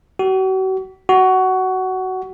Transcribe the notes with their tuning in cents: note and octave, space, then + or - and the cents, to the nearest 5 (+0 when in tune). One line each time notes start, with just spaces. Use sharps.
F#4 +40
F#4 +15